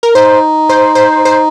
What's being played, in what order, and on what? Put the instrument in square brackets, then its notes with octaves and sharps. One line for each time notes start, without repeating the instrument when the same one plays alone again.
[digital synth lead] A#4
[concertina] D#4 [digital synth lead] C5
[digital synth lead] C5
C5
C5